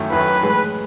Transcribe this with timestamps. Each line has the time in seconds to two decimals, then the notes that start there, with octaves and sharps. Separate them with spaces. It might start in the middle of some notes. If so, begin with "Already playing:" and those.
Already playing: F#2 D#3 A3 E4
0.12 F#2 D#3 A3 E4 B4
0.43 A2 E3 G#3